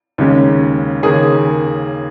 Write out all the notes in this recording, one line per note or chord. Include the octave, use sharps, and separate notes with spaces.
D#2 C#3 G#3 C#4
D#2 C#3 A#3 C#4 G#4